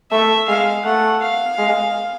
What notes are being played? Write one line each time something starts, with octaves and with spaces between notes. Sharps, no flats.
A3 E5
G#3 F5
A3 F#5
F5
G#3